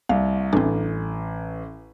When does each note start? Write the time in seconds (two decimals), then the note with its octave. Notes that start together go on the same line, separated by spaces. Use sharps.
0.09 C2 F5
0.53 A1 C4 D4